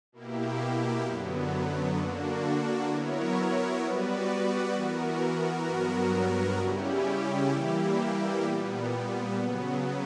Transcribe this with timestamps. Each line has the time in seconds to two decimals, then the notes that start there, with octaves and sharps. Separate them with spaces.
0.12 B2 A#3 E4 G4
1.04 F#2 D3 F#3 B3
1.96 D3 A#3 D4 F#4
2.89 F#3 B3 E4 A#4 C#5
3.81 G3 B3 F#4 B4 D5
4.74 E3 B3 F#4 A#4
5.66 G2 F#3 B3 F#4 A#4
6.58 C#3 G3 C#4 E4 G4
7.51 E3 G3 A#3 E4 G4
8.43 A#2 G3 B3
9.36 C#3 F#3 B3